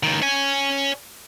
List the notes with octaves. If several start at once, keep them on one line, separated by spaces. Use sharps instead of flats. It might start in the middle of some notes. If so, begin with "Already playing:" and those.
C#2 D#3
C#5 G#5